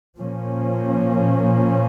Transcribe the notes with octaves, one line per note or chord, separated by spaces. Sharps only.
A#2 F3 A#3 C#4